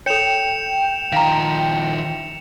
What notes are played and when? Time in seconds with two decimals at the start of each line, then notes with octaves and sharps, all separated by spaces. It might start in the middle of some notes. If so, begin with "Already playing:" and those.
0.06 A4 C#5 G5 C#7 E7 F7
1.12 D#3 F3 F5 A#5